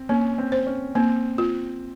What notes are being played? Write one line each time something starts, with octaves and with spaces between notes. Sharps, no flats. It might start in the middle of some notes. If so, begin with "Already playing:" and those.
Already playing: C4
A#3 C#4
C4
C5
C#4
A#3 C4
F4